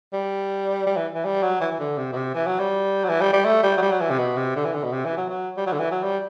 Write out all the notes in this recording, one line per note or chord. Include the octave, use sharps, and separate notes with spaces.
G3
G3
E3
E3
G3
F#3
E3
E3
D3
C3
B2
C3
E3
F#3
G3
F#3
E3
G3
G3
A3
G3
F#3
G3
F#3
E3
C3
B2
C3
D3
E3
D3
B2
C3
E3
F#3
F#3
G3
F#3
D3
E3
F#3
G3